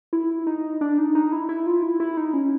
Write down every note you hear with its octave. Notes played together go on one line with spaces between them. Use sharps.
E4
D#4
D4
D#4
D#4
E4
E4
F4
E4
E4
D#4
C#4